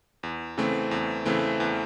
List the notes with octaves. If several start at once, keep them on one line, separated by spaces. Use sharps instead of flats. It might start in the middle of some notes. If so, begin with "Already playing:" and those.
E2
C#3 E3 A3 C4
E2
C#3 E3 A3 C4
E2